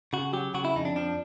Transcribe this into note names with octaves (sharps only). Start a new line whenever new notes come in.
C#3 F#4
F#3 G4
C#3 F#4
E4
F2 D#4
D4
F3 D4